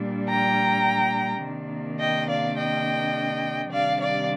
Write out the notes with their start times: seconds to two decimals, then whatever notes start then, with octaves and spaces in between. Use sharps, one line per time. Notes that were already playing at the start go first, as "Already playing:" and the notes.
Already playing: A#2 G3 D4
0.28 G5 A#5
1.44 C3 D#3 A#3 D4
2.00 D#5 G5
2.29 D5 F5
2.58 D#5 G5
3.72 C3 D#3 G3 D4 D5 F5
4.01 D5 F5